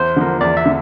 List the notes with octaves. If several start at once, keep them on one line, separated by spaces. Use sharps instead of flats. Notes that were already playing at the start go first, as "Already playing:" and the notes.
Already playing: E2 C5
D3 F3 A#3
E2 D5
E5
D3